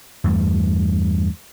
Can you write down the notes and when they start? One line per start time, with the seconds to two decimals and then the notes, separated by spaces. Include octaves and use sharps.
0.24 E2 G2 A3